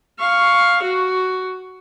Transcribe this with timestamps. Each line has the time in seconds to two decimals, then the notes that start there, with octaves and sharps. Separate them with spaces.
0.20 F5 C#6
0.83 F#4